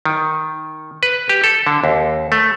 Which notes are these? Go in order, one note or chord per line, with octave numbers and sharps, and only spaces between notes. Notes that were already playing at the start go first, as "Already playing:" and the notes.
D#3
B4
G4
A4
D3
D#2
A3